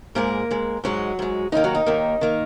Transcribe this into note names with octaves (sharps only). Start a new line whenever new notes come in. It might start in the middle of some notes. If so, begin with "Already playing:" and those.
G#2 G#3 A#3 A#4
G#2 G#3
G#2 F#3 G#3 F#4
G#2 G#3
D#2 D#3 A#3 D#4
F#3 F#4
D#4
D#2 D#3 A#3
D#3 A#3